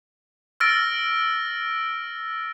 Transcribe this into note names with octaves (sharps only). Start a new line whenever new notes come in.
E6 F6 A6 A#6 D7